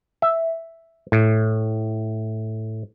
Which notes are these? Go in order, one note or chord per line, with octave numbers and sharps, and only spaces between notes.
E5
A2